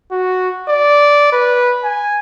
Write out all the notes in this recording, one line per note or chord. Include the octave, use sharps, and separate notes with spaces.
F#4
D5
B4
G#5